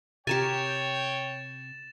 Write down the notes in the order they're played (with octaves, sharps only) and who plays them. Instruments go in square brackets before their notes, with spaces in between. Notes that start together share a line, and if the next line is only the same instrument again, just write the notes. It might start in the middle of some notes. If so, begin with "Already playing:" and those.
[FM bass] C3 [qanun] G4 A#4 G#5 [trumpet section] C#5 G5 [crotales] A6 E7